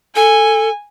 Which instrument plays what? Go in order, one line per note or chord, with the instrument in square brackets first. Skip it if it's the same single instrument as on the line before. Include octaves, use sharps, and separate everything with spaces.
[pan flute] A4 [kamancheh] G#5